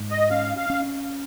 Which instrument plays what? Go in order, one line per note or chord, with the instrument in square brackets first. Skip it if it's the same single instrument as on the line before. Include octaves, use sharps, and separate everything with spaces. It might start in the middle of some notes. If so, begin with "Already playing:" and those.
Already playing: [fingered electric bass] G#2
[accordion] D#5
[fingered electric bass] C#4 [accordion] F5
[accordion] F5
[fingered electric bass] C#4